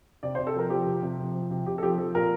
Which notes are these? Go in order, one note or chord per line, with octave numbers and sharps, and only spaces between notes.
C3 D5
C5
C3
A4
F3 A#4
F3 G4
C3
C3
F3
F3
C3
C3 G4
A4
F3 G4
F3 A4
A#2 A#4